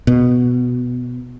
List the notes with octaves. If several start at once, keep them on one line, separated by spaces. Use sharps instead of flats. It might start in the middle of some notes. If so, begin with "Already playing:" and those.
B2